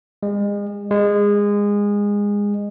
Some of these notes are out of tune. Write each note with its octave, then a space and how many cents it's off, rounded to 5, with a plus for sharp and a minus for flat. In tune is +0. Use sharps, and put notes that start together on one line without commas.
G#3 -35
G#3 -20